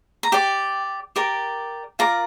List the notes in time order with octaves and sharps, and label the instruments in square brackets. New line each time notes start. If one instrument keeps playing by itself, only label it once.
[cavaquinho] A#5
G4 D5 G5
G4 A#4 D5
F4 A#4 D5 A#5